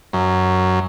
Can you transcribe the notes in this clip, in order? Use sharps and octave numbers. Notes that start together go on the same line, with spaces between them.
F#2